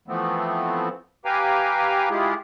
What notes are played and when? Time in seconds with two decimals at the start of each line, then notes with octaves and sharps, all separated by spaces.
0.08 E3 F3 A3 B3 C4
1.25 G4 B4 F5 G5 G#5 A#5
2.11 G#3 E4 F4 G4 G#4